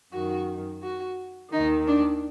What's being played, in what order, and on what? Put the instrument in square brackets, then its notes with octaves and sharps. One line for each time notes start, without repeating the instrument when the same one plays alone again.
[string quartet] F#2 D#3 F#4
F#4
D#2 D#3 D#4
D4